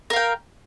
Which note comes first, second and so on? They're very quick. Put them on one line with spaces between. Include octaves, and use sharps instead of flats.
A#4 F5 G5